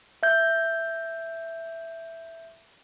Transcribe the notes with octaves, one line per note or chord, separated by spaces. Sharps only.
E5 G6